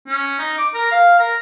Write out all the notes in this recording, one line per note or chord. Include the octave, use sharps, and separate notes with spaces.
C#4
D#4
D6
A#4
F5
A#4